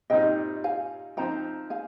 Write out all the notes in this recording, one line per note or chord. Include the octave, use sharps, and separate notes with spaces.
A#2 G3 C4 D#4 D#5 G5
F5 G#5
F3 C4 D#4 G5 A#5
F5 G#5